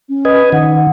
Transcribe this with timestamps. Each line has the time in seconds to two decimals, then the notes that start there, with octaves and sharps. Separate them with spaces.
0.09 C#4
0.25 B4 D#5 G#5
0.52 D#3 F#5